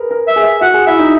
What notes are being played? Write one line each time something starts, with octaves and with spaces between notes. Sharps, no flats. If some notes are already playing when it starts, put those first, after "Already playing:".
Already playing: G#4 A#4 B4
A#4
E5
G#4
E5
F#4 F#5
G#4
E4 E5
D#4